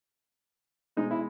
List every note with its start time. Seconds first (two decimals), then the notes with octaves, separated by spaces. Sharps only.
0.97 B2 G#3 D#4
1.11 E4